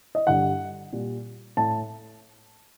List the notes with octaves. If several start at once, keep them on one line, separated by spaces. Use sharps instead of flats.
D#5
G2 D3 G3 F#5
A#2 G3
A2 A5